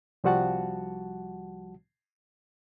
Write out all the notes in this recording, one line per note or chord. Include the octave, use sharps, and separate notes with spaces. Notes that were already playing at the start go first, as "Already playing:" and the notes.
C2 F3 G3 F#4 F#5 A5